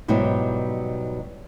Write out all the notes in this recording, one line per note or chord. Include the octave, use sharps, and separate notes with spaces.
G#2 B2 F#3 G3 E4 G4